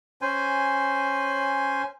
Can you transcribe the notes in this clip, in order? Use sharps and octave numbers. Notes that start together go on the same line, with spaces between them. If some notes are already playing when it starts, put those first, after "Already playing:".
C#4 C5 G#5